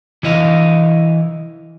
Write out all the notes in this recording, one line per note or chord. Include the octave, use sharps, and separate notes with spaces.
E3 E4 D#5 F5